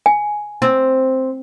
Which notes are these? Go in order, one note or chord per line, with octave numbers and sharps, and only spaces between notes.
G#5
C4